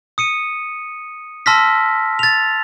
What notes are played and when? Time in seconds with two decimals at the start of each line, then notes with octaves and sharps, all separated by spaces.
0.18 D#6 C#7 D#7
1.46 A5 C6 E6 F6 A#6 B6
2.19 A6 F7